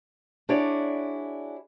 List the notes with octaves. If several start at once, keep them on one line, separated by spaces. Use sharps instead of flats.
D4 E4 F#4 G#4 C#5 D5